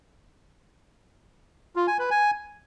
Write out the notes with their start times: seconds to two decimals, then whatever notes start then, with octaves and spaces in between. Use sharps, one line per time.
1.76 F4
1.87 G#5
1.99 B4
2.11 G#5